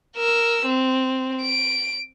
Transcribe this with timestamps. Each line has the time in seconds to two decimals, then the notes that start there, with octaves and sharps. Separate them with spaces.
0.16 A#4 E6
0.66 C4
1.42 D7